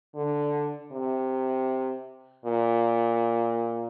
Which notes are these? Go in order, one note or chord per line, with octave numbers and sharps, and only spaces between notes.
D3
C3
A#2